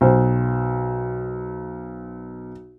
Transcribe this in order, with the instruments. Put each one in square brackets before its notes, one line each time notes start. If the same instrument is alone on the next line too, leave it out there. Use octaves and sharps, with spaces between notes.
[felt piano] B1 C5